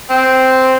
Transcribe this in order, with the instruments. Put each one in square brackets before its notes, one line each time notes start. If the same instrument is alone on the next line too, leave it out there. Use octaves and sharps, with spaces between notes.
[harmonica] C4